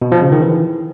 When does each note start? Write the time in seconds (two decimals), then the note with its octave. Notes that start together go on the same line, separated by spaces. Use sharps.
0.02 B2
0.12 F3
0.22 C#3
0.32 D#3
0.42 E3